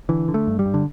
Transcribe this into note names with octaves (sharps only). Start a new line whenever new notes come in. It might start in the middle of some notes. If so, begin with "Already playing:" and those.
D3 E3
D3
A3
G2
G3
G2
D3